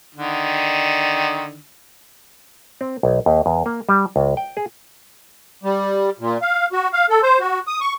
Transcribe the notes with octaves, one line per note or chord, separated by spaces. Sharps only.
D3 D#3
C4
B1
D#2
E2
A#3
G3
C#2
G5
G#4
G3
A#2
F5
F#4
F5
A4
C5
F#4
D#6
C#6